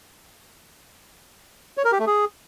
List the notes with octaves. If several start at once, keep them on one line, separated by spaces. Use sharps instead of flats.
C#5
A#4
G4
A3
G#4